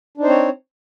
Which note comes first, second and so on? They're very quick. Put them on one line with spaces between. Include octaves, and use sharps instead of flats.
D4 D#4 C5 C4 C#5